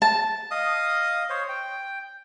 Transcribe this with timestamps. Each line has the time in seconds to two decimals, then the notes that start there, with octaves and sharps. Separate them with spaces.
0.02 A5
0.51 D#5 F5 D#6
1.30 C5 C#5
1.49 G5